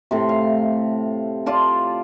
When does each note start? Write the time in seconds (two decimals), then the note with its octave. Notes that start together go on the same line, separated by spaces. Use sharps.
0.11 A2 C3
0.29 F5
1.46 F4 D5 A5